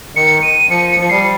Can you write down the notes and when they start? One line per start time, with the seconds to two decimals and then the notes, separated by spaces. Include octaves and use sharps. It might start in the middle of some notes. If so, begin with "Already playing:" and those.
0.15 D#3 C#7
0.42 D#7
0.69 F3 C#7
0.90 C#7
1.00 F3
1.09 G3 C7